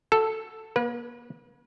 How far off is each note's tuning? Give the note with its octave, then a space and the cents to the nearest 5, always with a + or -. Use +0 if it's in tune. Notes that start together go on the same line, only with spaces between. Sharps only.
F#4 +0 A4 +0
A#3 +40 B4 -30